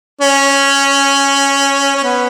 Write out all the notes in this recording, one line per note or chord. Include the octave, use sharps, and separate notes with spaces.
C#4
C#4
B3